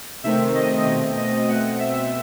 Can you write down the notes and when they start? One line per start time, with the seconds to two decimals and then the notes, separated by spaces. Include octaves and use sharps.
0.24 C3 D#3 A3 C4 E5
0.55 D#5
0.86 B2 A3 C4
1.17 D#5
1.48 B2 A3 C4 F#5
1.79 E5